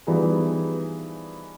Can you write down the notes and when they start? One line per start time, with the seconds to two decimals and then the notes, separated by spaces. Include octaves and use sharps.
0.07 E3 F3 G3 B3 D#4 G#4